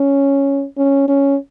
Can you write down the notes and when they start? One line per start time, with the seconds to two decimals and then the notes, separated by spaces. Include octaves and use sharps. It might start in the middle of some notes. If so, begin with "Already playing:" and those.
Already playing: C#4
0.78 C#4
1.08 C#4